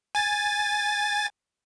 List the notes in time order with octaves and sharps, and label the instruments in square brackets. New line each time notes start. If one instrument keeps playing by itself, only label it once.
[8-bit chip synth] G#5 A6